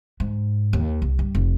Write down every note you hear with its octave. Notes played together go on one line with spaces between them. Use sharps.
G#2
D#2
C2
G2
F1